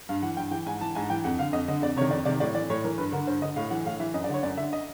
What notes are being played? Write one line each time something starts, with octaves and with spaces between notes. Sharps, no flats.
G2 F5
E3 F#5
G2 G5
E3 G5
G#2 G#5
E3 A5
G#2 G#5
E3 G5
F2 F#5
D3 F5
F2 D#5
D3 D#5
F2 D5
C3 D#3 C#5
F2 D5
C3 D#3 D5
A2 D5
E3 D5
A2 C#5
E3 A#4
G2 B4
D3 A#4
G2 C5
D3 D#5
A2 F5
E3 F#5
A2 F5
E3 E5
F#2 D#5
D5
D3 C#5
F#2 D5
D3 E5
D#5